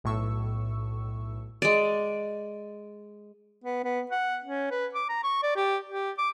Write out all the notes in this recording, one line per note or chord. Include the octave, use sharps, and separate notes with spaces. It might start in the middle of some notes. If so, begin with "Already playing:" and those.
B1 A2 C#6 E6
G#3 D5
B3
B3
F#5
C#4
B4
D6
A#5
C#6
D5
G4
G4
D6